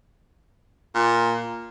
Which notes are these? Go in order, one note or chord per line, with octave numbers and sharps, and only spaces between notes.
A#2